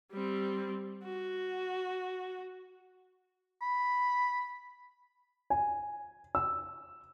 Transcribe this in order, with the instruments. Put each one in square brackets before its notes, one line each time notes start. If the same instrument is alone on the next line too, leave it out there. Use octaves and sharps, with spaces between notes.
[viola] G3 C4
F#4
[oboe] B5
[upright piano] G#5
E6